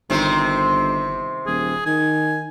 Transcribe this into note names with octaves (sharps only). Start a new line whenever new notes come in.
G1 C3 D#3 C4
D#1 G#4
D#3 G#5